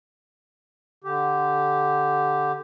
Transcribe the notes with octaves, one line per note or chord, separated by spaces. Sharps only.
D3 G4